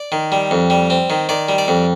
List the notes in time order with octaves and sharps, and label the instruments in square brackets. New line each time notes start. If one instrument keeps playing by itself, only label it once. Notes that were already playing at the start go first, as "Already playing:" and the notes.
Already playing: [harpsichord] D5
D#3
G3
F2
G3
C4
D#3
D#3 D5
G3
D5
F2